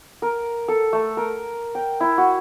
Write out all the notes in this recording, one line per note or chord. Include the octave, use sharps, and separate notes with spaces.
A#4
A4
A3
A#4
G5
E4
F#4